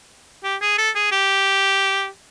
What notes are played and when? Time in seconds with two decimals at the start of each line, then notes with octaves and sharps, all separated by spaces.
0.44 G4
0.61 G#4
0.78 A4
0.95 G#4
1.12 G4